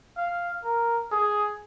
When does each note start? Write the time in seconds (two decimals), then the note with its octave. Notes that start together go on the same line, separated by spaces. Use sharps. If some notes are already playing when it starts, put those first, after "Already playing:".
0.17 F5
0.64 A#4
1.12 G#4